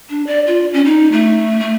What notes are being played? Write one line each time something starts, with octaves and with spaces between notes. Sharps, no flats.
D4
D5
F4
C#4
D#4
A3
A3